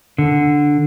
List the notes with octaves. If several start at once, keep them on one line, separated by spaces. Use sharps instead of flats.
D3